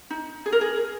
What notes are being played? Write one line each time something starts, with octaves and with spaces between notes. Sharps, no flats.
D#4
G#4
A#4
G#4